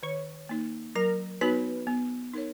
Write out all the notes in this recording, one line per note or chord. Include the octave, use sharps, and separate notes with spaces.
D#3 C#5
A#3 D#4
F#3 A#4
B3 D#4 F#4 B4 C#5
B3
D#4 A#4 C#5